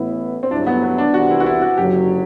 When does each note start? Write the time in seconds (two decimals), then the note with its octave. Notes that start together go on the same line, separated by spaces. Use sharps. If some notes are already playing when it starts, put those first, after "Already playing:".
Already playing: A1 A2 E3 B3 E4
0.43 C4
0.51 G1 G2 F#3 A3 D4 E4
0.67 B3
0.83 B3
0.98 D4
1.14 C2 C3 E3 F#4
1.31 E4
1.40 F#4
1.46 E4
1.62 F#4
1.77 F#1 F#2 D3 F#3 G4